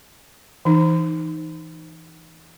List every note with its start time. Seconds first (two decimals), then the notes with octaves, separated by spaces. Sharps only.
0.65 E3 D#4